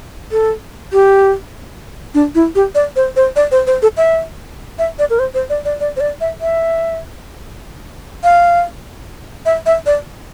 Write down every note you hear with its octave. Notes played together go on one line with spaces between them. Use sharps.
A4
G4
D4
E4
G4
D5
C5
C5
D5
C5
C5
A4
E5
E5
D5
A#4
C5
C5
D5
D5
D5
C5
D5
E5
E5
F5
E5
E5
D5